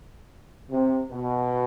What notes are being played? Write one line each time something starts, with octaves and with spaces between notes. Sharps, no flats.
C3
B2